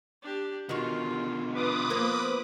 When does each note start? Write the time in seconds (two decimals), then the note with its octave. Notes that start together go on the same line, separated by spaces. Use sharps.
0.22 D4 G4
0.69 B2 D3 D#3 F4 F#4
1.54 D4 F4 B4 D6 D#6
1.90 F3 A#3 B3